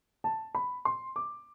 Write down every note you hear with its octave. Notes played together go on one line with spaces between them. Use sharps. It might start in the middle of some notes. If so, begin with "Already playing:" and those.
A5
B5
C6
D6